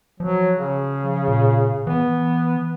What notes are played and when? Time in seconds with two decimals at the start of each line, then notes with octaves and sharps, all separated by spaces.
0.20 F3 F#3
0.59 C#3
1.28 A#2
1.87 E3 B3